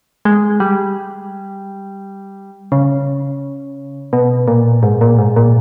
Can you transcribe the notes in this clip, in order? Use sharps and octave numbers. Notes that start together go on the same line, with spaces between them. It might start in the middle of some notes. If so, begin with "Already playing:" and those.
G#3
G3
C#3
B2
A#2
G#2
A#2
G#2
A#2